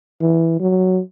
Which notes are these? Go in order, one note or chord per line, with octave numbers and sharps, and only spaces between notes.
E3
F#3